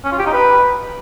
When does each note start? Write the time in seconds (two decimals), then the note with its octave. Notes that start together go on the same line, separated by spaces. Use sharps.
0.05 C#4
0.12 F4
0.19 G4
0.26 D#4
0.33 B4